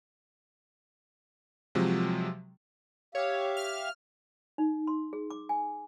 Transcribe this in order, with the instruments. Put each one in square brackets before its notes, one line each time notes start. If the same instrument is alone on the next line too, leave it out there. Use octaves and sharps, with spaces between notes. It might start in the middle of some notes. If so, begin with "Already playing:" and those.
[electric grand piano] C3 F3 F#3 G#3
[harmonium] G4 E5 F5 [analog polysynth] C#5
[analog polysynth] F6
[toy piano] D#4
C6
G#4
D6
G#5